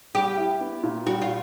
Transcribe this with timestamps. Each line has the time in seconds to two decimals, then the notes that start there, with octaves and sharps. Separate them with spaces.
0.15 G3 G4
0.37 E4
0.61 B3
0.83 A#2
1.06 G3 F#4
1.22 F4